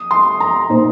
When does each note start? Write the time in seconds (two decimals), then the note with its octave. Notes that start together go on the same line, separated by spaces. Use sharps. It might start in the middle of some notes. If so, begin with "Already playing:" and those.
Already playing: D#6
0.11 C6
0.40 A#5
0.70 A#2 A#3 D#4 C5